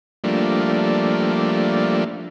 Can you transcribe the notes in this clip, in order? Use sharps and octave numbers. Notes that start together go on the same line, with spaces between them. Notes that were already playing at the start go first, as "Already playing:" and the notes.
F3 G3 A3 A#3 D4